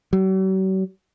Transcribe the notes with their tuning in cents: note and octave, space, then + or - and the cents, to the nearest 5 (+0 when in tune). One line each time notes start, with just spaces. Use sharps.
F#3 +45